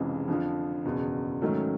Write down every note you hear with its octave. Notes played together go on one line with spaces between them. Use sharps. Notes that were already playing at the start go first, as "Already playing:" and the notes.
Already playing: F1 F2 C#3 E3 G#3
F2 D3 F3
F#1 E2 B2
G#2 D#3 F#3 A3 C#4